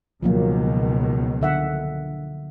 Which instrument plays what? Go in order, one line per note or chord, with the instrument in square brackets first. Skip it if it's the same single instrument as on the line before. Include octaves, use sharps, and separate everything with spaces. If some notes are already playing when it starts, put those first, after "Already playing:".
[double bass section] C#2 B2 D#3 [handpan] F3 F#3 A#3
[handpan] D3 E5 F#5